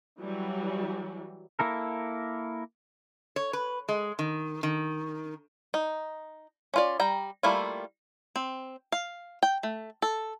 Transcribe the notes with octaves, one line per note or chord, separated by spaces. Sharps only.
E3 F#3 G3
A#3 E4 A4 A#4
C#5
B4
G#3
D#3
D#3
D#4
C#4 F4 D5
G3 G5 A#5
G3 A3 A#3 E4 F4
C4
F5
G5
A3
A4